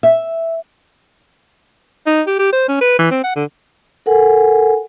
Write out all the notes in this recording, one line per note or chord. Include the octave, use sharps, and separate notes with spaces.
E5
D#4
G4
G4
C5
C#4
B4
E3
C4
F#5
D3
A4 A#4 F#5 G#5